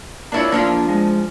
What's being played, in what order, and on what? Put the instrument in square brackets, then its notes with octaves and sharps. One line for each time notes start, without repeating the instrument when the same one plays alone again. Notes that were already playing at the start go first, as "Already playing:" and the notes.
[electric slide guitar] A#3 F4 C#5 [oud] D4 E4
[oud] F3 D4 F4 [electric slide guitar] A#3
[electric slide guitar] G#3